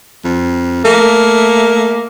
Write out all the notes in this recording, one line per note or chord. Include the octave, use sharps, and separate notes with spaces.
F2
A3 A#3